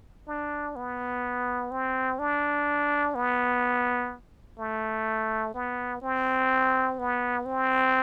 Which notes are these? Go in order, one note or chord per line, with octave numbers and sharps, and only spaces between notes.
D4
B3
C4
D4
B3
A3
B3
C4
B3
C4